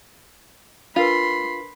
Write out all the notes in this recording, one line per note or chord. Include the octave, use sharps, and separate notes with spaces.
D4 F4 A#4 B4 B5 C6